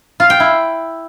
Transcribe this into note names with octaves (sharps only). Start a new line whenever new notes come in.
F4
G5
E4